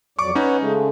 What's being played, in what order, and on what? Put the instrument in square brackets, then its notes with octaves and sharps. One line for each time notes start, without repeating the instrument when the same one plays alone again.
[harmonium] F2 F#3 D5 [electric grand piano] C#6 D6
[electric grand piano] C#4 D#4 [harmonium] B4 C#5 F#5
[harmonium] C#3 G#3 A3